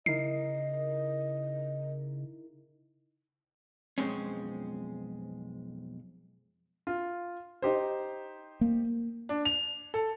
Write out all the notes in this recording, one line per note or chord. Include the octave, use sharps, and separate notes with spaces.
C#3 D#4 E4 A#4 D#5 C7
B1 F2 G#3 C4 C#4
F4
D#4 G4 C5
A#3
D4
F7
A4